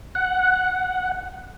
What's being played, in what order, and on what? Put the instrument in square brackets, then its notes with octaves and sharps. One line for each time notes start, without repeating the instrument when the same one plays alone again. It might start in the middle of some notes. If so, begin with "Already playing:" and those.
[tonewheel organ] F#5